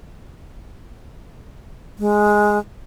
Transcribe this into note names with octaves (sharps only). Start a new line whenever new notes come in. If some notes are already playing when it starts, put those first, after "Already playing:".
G#3